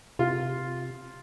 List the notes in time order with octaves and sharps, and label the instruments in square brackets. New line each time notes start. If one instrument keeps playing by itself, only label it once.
[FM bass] C3 [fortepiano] F4